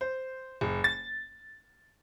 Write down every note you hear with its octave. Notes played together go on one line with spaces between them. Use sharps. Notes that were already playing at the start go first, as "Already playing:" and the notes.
C5
F#1
A6